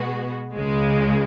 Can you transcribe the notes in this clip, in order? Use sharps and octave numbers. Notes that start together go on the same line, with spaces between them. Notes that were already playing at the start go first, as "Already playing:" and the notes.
Already playing: B2 G#3 B3 F#4
C#2 C#3 G#3